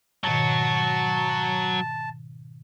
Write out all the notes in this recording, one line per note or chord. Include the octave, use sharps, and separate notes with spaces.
G#2 B2 D#3 F#3 F#4 A5